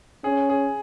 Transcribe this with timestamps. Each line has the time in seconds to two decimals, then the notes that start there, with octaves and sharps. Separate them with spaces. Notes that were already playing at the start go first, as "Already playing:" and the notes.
0.24 C#4 G#4
0.49 G#4